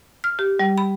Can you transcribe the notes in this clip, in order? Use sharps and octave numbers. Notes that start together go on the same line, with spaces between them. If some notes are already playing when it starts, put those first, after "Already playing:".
F6
G4
G3
B5